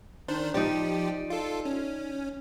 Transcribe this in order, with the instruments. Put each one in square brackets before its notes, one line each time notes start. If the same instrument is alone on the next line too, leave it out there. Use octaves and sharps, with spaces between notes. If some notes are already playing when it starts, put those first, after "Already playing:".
[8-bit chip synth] D#3 D4 C5
[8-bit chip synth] F3 G4 [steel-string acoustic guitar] D#4 D5
[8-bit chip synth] F4 A4
C#4